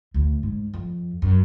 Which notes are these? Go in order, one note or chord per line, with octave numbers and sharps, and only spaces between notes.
D2
G#2
F2
F#2